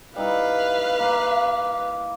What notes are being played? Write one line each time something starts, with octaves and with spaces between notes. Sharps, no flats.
G3 D#4 E4 B4 F5
A#3